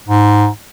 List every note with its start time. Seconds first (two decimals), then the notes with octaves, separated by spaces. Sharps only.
0.08 G#2